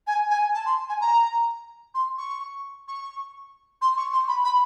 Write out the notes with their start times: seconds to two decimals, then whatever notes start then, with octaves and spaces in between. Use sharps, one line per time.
0.07 G#5
0.30 G#5
0.54 A5
0.66 C6
0.89 G#5
1.01 A#5
1.94 C6
2.18 C#6
2.88 C#6
3.81 C6
3.97 C#6
4.13 C6
4.28 B5
4.44 B5